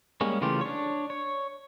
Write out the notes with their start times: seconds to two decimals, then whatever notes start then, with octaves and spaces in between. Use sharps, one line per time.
0.21 G3 G#3 A#3 C#4
0.41 C#3 E3 A3 F4 G4
0.61 D4 C#5
1.10 C#5